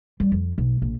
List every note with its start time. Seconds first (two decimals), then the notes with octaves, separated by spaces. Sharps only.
0.20 G3
0.32 F2
0.58 B1
0.82 A#1